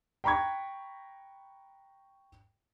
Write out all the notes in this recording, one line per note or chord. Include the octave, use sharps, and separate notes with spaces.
G5 A#5 B5 C#6 G#6